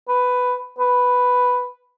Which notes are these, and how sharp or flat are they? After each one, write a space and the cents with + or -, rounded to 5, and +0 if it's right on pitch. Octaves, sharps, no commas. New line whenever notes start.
B4 +10
B4 +0